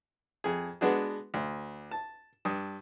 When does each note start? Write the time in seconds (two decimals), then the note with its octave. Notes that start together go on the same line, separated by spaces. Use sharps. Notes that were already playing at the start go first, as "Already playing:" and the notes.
0.44 F2 G#4
0.81 G#3 B3 D4 F#4 G#4
1.34 D2
1.91 A5
2.45 G2 D4 D#6